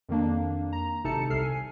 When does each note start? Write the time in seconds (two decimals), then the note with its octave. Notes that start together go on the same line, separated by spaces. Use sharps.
0.09 F2 D#3 A#3 D4
0.73 A#5
1.04 G#1 C3 D#4 A4 A5 C#7
1.30 C2 C3 A4 F6 C7
1.43 G#5